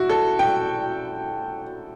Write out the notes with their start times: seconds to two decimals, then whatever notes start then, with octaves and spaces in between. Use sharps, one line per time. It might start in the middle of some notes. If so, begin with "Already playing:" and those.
Already playing: E4 F#4
0.09 A4
0.39 G5